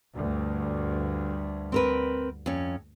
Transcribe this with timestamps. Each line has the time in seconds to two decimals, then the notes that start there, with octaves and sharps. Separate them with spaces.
0.13 D2 G2
1.72 C4 A#4 B4
2.46 F2 C#4